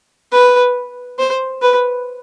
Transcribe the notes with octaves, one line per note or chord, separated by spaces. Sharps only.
B4
C5
B4